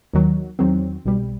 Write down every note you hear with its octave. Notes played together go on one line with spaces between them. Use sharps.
D#2 D#3 F#3
E2 D#3 F#3 C4
B1 B2 G3